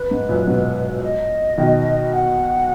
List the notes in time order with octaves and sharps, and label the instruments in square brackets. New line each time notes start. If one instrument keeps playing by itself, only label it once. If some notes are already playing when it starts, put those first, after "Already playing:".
Already playing: [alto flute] B4
[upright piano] G#2
F#2 A#2
G#2 B2
[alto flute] D#5
[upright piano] B2 D#3
[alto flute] F#5